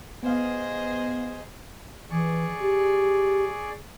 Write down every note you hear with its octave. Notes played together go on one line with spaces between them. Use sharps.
B3 G#4 C5 D#5 F5
E3 G#4 D5 C#6
G4